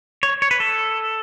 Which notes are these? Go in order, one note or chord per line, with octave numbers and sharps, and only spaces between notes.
C#5
C#5
B4
A4